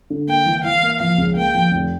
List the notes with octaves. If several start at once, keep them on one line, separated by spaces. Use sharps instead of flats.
D3
A#3 G5
E3
E3 F5
A#3
F3 F5
C#2
A#3 G5
F3
F1